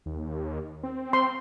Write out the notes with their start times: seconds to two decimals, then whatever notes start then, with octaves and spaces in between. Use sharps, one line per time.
0.06 D#2
0.83 C4
1.13 C6